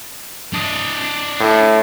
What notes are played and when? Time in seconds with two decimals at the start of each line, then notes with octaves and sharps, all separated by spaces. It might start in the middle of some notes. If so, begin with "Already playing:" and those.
0.54 D4 D#5
1.40 A2